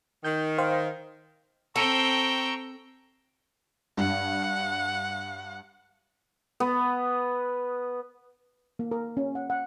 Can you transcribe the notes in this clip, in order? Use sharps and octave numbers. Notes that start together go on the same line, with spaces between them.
D#3 G6
C5 F5 G5
C4 A4 G5 A#5 C#6 E6
G2 F#5
B3
A#3
A#4
C#4
F#5
F#5